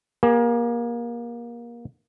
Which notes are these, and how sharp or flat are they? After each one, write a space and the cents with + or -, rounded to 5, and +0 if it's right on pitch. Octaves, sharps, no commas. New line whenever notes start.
A#3 +25 G#4 -40